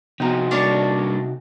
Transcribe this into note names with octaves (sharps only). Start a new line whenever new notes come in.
C3 F3 B3 D#4 F#4 A#5
G3 A#3 D4 C#5 C#6